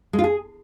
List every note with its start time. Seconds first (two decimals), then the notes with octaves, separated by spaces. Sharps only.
0.13 G#3
0.19 F4
0.24 G#4